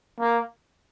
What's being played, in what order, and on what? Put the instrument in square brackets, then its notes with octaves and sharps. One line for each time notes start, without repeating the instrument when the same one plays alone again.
[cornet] A#3